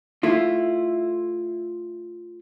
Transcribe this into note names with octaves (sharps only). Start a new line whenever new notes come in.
A3 E4 F4